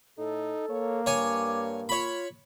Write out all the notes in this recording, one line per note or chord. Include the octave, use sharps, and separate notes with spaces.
A2 D#4 A4
A#3 C#5
G2 C#5 G#5 D6
F4 C#5 B5